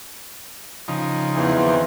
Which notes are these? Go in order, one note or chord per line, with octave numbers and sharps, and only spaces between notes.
C#3 F3 D#4
E2 E3
D#3 F3 C4